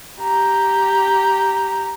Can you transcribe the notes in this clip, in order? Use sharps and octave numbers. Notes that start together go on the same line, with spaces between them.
G4 A#5